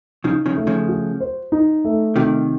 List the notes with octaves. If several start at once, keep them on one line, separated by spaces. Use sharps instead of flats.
C#3 F3 D#4
C#3 F3
A3
C#3 F3
F#4
C5
D#4
A3
C3 D#3 F#4